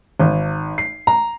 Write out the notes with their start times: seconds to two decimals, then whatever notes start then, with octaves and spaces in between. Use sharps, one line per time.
0.20 G#1
0.78 C7
1.07 A#5